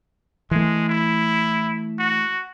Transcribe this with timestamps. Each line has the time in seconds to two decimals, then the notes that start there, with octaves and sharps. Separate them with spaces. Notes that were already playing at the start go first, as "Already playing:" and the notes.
0.51 E3 G#3 A3
0.89 E4
1.99 F#4